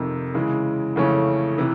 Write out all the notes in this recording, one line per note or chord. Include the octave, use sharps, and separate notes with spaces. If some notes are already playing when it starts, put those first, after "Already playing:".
Already playing: F2 C3 D#3
C#3 E3 G#3
F2 C#3 E3 A3 C#4
C3 E3